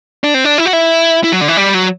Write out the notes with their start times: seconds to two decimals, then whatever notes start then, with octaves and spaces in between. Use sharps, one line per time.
0.24 D4
0.34 C4
0.45 D4
0.58 E4
0.66 F#4
0.73 E4
1.24 E4
1.32 F#3
1.41 D3
1.48 E3
1.57 G3
1.74 F#3